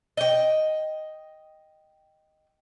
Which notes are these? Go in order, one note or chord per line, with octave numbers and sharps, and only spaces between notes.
D#5 G5